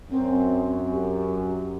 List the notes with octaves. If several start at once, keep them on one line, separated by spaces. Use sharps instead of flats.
F#2 C4
G4